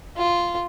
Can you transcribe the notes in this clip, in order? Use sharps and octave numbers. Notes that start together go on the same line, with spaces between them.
F4